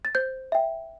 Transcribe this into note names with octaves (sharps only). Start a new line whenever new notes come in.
A6
C5 G6
E5 G5